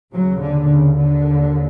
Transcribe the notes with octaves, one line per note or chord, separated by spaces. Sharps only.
D#2 C#3 F#3
D3
C#3
D3